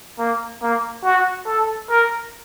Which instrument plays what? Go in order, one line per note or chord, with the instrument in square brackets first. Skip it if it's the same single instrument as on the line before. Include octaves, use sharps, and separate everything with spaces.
[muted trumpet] A#3
A#3
F#4
A4
A#4